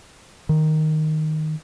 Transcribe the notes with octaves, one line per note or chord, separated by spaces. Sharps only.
D#3